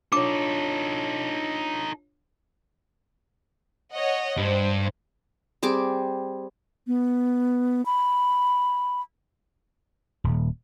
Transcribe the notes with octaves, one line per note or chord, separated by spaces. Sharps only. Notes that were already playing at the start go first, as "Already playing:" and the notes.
D4 D#4 F4 A4 C#5 D6
C#5 D#5 F#5
G2 C5
G3 C4 G#4 D6
B3
B5
D#1